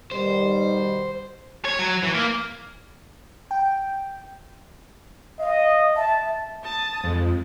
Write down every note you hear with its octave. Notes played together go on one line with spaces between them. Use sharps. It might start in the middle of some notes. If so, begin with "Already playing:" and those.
B2 D#3 G3 C5
C#5
F#3
E3
A#3
G5
D#5 F5
E5 A5
A5 D#6 A6
F2 G#3